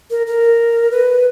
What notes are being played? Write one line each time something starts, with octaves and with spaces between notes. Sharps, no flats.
A#4
A#4
B4